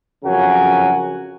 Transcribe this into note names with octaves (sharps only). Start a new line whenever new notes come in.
F2 C#3 F#3 F#4 A#4 G#5